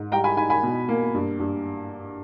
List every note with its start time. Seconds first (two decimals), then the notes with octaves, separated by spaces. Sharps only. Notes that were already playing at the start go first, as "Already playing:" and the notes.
Already playing: G#2
0.12 G3 G5 A#5
0.24 G#5 B5
0.37 D#4 G#5 B5
0.50 G#5 B5
0.63 B2
0.88 A#3
1.14 G2
1.40 G2